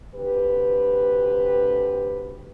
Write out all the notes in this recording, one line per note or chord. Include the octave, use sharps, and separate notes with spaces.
D2 C3 G4 B4